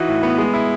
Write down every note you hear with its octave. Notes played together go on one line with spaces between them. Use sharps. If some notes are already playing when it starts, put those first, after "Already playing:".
Already playing: E3 D#4 F#4
A2
B3
G#3
E4